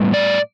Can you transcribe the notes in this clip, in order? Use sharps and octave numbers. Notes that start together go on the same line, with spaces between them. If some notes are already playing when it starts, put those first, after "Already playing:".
Already playing: A2 G3 B3
D5